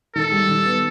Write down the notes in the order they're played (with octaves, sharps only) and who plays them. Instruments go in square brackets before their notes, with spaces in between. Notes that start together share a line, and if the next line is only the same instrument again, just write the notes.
[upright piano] D#3 [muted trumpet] A4
[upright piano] G3
D#3
B3